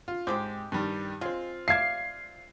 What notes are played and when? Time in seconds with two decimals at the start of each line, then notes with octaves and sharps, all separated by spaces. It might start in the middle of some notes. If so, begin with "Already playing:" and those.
0.08 F4
0.27 G#2 G#3 C4 G4 D6
0.72 G2 D#3 G3
1.21 G#3 C4 F4
1.68 D5 E5 F5 G#6 C7